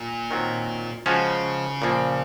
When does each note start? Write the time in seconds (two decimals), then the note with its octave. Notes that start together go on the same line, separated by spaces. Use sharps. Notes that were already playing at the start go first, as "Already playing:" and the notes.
Already playing: A#2
0.31 D#3 F#3 C4
1.06 C#3 F3 G#3 C#4 F#4 C#5
1.82 A#2 F3 A#3